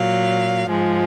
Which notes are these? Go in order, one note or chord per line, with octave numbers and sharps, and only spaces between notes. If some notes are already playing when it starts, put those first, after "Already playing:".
Already playing: A#2 F#3 F5
G#2 F3 G#3